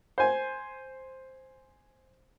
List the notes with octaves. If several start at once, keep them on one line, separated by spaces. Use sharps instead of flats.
C5 G#5